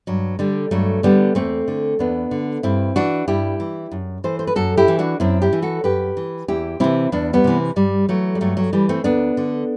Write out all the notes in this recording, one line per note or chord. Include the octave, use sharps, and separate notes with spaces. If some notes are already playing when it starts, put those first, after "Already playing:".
G2 F#3
D3 G3
G2 F#3 A3
D3 G3 B3
E2 A3 C4
D3
E2 B3 D4
D3
G2 C4 E4
E3 D4 F#4
G2 E4 G4
E3
F#2
E3 A4 C5
C5
B4
F#2 F#4 A4
E4 G4
E3
D4 F#4
F#2 C4 E4
E4 G4
E3
F#4 A4
F#2 G4 B4
E3
E2 E4 G4
C3 E3 C4 E4
E2 B3 D4
G3 B3
C3 E3
G2 G3
E3 F#3 A3
G3
G2 F#3 A3
F#3
E3 G3
A3 C4
D2 B3 D4
D3